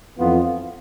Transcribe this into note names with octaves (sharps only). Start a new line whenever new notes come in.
F2 E3 B3 F4